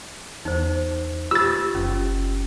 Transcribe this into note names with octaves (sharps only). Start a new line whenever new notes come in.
E2 D#4 C5
F4 G4 B4 E6 A6
F#1 C#4